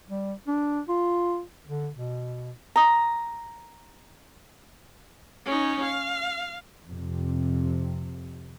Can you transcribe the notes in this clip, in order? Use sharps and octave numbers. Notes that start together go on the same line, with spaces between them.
G3
D4
F4
D3
B2
A#5 D#6
C#4 D#4
F5
F2 C3